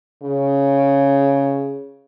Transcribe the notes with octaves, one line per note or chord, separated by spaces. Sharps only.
C#3